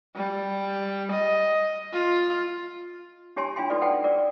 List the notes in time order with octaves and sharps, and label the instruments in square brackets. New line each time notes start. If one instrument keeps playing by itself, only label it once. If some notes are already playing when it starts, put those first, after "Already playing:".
[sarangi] G3
D#5
F4
[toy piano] D4 G4 C#5 G#5 A5 C6
D4 F4 G5 G#5 C6
D#4 F#4 A4 B4 D5
A4 B4 F#5 G5 A5
A#4 D5